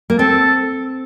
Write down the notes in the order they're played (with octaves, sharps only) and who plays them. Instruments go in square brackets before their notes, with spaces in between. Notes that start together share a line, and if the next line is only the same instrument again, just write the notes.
[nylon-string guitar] A#3
[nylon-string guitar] C4 [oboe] A4